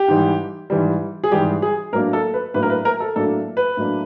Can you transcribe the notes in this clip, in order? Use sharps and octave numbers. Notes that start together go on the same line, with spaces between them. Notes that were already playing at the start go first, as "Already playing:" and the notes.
Already playing: G4
G#2 E3 G3
G#2 E3 G3
G#4
G#2 E3 G3 G4
G#4
A2 F#3 A#3 D4 A#4
A4
B4
A2 F#3 A#3 D4 B4
A#4
B4
A#4
A4
A2 F#3 A#3 D4 A4
B4
A2 F#3 A#3 D4